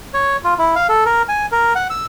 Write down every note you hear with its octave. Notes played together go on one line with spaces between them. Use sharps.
C#5
F4
E4
F5
A4
A#4
G#5
A#4
F#5
E6